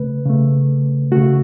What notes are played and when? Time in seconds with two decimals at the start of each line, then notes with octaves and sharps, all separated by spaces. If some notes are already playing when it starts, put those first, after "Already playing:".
Already playing: C#3 A3 B4
0.26 C#3 A3
1.12 C#3 A3 F#4